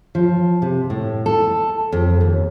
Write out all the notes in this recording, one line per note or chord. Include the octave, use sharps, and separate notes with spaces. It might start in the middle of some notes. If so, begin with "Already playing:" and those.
F3
C3
A2
A4
F2
D#2